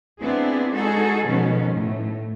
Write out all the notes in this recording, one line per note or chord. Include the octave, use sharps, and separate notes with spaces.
B3 C4 D4 E4 G#4
G#3 D#4 F#4 G#4 A4
B2 D#3 F3 B3 C#4
A2